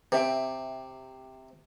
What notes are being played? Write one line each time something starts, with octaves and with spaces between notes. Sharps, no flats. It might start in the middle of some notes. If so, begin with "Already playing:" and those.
C3 C5 E5 G5